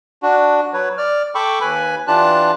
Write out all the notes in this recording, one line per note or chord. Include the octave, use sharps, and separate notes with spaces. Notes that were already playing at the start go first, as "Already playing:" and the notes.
D4 F#4
F#3 B4 C#5
D5 F6
A4 G5 B5 C#6 D6 E6
D#2 B4 G#5 B5
E3 D4 F4 G4 A5 F#6